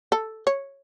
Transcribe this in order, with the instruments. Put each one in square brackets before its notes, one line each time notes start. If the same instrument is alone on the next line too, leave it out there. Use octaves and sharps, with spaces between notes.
[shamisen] A4
C#5